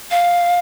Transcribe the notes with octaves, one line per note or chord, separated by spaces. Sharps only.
F5